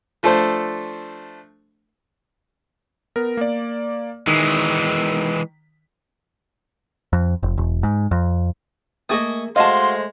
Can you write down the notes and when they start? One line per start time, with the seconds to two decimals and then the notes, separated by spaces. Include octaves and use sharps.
0.23 F3 A3 D4 A4 C5
3.16 B3 A#4
3.37 A#3 D5
4.27 D#3 E3 G#3 B6
7.13 F2
7.43 F1
7.58 E1
7.83 G#2
8.11 F2
9.09 A3 A#3 G#4 D#5 C#6 D#6
9.56 G#3 A3 F#4 C5 D#5 F5 A5 C6